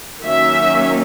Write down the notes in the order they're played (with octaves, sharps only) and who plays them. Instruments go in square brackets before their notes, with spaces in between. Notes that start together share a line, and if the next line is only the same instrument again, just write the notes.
[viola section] D#3 F#3 A#3 C#4 E5